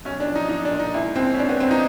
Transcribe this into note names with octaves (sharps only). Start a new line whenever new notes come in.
B1 C#4
D4
F3
D#4
B1 D#4
D4
A#2
D#4
C#2 E4
C#2 C4
C#4
C#2 D4
B3
C#2 C4
D#4